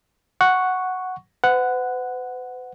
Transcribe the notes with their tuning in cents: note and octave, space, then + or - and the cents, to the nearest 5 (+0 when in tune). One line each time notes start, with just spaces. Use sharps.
F#5 +0 C#6 +0
B4 +45 F#5 +0